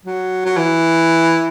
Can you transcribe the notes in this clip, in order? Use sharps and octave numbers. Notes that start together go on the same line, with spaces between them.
F#3
F#3
E3